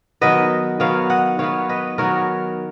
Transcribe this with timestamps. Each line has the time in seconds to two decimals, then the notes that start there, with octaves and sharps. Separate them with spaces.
0.21 D#3 F#3 B3 B4 D#5
0.80 D#3 F#3 B3 C#5 F5
1.10 D#5 F#5
1.39 D#3 F#3 B3 C#5 F5
1.69 B4 D#5
1.98 D#3 F#3 B3 A#4 C#5